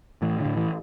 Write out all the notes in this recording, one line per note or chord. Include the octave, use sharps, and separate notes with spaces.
A2 E3
D3
A2
E3